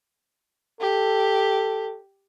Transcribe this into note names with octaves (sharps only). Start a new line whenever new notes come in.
G4 A4